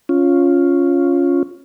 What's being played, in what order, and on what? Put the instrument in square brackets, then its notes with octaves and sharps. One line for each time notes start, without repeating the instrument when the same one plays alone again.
[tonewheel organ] C#4 F4